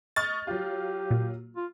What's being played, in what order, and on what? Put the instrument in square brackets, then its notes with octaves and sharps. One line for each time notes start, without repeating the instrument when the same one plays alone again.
[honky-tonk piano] D#5 C#6 F6 [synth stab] A6
[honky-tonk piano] F#3 F4 [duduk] G4
[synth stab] A#2
[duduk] F4